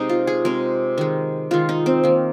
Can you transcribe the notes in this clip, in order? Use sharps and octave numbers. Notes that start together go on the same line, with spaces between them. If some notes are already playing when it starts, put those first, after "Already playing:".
Already playing: C3 G#3 D#4
F4
G#4
C3 G#3 A#4
D#3 G#3
D#3 G#3 F4
D#4
C4
D#3 A#3